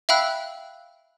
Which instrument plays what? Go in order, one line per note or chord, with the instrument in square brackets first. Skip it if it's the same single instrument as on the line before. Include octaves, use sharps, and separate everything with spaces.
[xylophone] E5 F5 G5 B5 E6 F#6